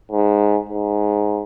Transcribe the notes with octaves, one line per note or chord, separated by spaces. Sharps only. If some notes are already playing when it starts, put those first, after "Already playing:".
G#2
G#2